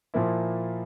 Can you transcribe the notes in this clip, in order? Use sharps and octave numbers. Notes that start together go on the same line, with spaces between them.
A#2 F3 A#3 E4